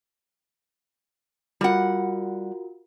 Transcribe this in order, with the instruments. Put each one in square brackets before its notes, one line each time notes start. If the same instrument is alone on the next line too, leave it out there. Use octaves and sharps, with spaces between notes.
[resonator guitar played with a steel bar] G3 F#5 [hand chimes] F4 F#4 A#4